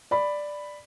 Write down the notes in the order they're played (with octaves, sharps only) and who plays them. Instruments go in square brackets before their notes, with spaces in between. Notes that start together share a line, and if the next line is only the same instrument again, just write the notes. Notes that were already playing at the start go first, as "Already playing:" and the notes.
[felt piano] D5 B5